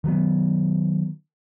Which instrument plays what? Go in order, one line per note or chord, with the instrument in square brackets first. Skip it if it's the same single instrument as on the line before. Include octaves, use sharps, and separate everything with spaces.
[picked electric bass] D#3 F#3 G#3 B3